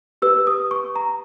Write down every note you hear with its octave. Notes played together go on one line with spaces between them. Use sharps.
G4 B4 E6
D#6
C#6
A#5